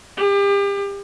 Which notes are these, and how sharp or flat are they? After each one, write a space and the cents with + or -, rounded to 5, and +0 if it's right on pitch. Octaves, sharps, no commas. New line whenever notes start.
G4 +35